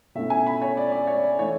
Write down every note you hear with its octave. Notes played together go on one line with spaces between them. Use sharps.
B2 A3 C#4 E4 E5
G#5
B5
C#5
D5
D5
C#5
D5
E3 A3 E4 C#5